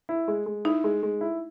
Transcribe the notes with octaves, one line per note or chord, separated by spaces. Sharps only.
E4
G#3
G#3
D#4 E4
G#3
G#3
E4